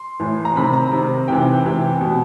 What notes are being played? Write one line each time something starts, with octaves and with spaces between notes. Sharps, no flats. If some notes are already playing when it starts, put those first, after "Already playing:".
Already playing: C6
A2 E3
A#5
C3 D#3 B5
A#5
C3 D#3
C3 E3 G5
C3 E3
B2